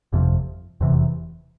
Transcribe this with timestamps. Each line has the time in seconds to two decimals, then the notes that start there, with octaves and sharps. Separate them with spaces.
0.13 G1 F2 C3 F3
0.81 F1 E2 C3 E3